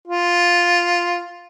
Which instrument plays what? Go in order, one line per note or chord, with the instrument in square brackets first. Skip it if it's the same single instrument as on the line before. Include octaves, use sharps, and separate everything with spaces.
[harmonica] F4